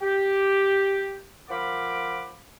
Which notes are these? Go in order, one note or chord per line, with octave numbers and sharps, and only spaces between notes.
G4
F3 A#4 F#5 B5 D6